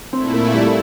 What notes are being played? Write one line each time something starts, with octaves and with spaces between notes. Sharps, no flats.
A#2 A3 C4 E4
A#3
G3